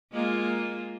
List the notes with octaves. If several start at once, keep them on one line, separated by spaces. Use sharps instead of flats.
G#3 A#3 F4